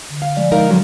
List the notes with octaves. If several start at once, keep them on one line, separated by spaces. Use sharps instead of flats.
D3
F5
F3 G#3 D5
D#4 A#4 F5
D3 F#3 G3